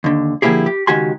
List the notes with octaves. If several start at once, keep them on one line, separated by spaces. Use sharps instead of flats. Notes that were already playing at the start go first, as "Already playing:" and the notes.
D#2 D3
D3 F3 A#3 E4 G4 G#4
G4
C#2 D#3 F#4 G4 G#5 C6